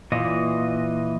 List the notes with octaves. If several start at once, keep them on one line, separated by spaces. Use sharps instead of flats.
A#2 E3 D#5